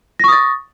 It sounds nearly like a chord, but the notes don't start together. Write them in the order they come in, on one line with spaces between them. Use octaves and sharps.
A#6 C#6 D#6 A6